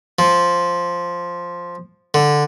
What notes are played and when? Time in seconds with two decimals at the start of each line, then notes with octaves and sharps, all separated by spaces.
0.19 F3
2.14 D3